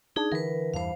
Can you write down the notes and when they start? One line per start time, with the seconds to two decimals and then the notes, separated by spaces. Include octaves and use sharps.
0.16 D4 D#4 G#4
0.32 D3 E3 A#4 B4
0.74 E2 G2 E3 C5 F5